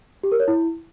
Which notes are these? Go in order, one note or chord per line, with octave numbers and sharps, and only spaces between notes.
G4
A#4
C#5
E4